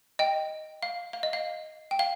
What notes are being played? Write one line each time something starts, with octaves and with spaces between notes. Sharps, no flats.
D#5 G5
F5
F5
D#5
F5
G5
F5